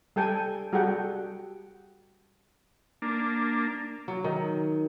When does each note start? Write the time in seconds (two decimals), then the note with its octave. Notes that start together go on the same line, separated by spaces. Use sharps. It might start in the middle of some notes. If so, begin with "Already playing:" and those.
0.16 G3 A4 G5 G#5
0.73 G3 F#4 G#4 A4 F#5 G5
3.02 A#3 D4
4.08 F#3
4.24 D#3